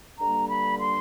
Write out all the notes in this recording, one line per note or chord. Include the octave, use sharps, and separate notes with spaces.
G2 D3 G3 A#3 A#5
B5
C6